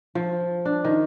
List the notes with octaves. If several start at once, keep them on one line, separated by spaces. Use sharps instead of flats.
F3
D4
D#3